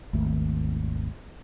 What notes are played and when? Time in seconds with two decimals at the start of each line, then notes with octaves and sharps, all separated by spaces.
0.13 G#1 D#2 D#3 A3